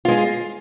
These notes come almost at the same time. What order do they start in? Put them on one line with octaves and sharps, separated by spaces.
F4 G#3 G#4